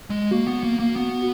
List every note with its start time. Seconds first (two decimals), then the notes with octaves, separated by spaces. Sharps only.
0.10 G#3
0.31 A#3 F#4
0.47 B3
0.63 A#3
0.80 A#3
0.96 B3